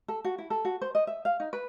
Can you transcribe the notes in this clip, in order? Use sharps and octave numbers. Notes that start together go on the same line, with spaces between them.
A4
F#4
E4
A4
F#4
C5
D#5
E5
F5
D#4
B4